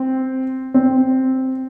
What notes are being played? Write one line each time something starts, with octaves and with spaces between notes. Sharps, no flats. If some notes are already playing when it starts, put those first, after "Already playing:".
Already playing: C4
C4